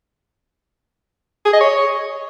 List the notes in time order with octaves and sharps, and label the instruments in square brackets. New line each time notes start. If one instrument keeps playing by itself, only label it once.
[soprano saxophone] G#4
D#5
C#5